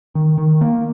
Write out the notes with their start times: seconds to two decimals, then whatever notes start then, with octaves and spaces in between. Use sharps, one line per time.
0.15 D#3
0.38 D#3
0.61 A#3